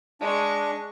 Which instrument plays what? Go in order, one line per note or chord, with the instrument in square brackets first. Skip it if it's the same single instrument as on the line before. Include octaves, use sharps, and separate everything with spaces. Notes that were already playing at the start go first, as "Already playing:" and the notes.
[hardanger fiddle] G#3 C#6 [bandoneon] D4